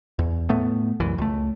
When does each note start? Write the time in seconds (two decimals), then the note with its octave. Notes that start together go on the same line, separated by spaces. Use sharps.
0.19 E2
0.50 A2 A3 B3
1.00 C2 F#2 E3
1.18 C#2 A3